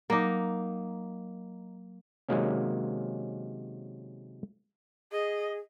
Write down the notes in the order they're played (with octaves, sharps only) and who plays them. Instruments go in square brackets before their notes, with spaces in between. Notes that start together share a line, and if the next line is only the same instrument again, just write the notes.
[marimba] F#3 D6 A#6 [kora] A#3 D#4
[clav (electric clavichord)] C3 D#3 F#3 G#3 A#3 C#4
[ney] G#4 [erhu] D#5